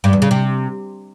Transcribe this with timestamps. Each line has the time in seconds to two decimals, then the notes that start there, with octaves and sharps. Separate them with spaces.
0.04 G2
0.13 E2
0.22 C#3
0.31 C3